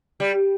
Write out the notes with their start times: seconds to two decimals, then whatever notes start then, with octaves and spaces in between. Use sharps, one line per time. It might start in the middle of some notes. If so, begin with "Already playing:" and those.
0.20 G3